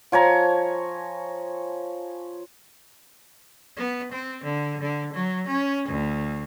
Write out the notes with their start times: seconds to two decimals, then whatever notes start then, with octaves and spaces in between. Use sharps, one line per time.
0.12 F3 C#5 G#5 A#5
3.77 B3
4.12 C4
4.44 D3
4.81 D3
5.13 F#3
5.47 C#4
5.88 D2